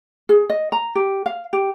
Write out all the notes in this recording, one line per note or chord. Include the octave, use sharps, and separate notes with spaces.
G#4
D#5
A#5
G4
F5
G4